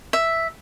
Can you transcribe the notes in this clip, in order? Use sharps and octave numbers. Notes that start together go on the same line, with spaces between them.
E5